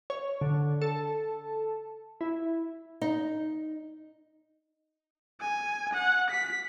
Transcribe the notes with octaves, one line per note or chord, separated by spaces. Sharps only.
C#5
D3
A4
E4
D#4
G#5
F#5
B6